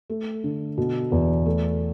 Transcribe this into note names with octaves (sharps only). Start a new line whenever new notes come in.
A3
D3
B2
E2
A3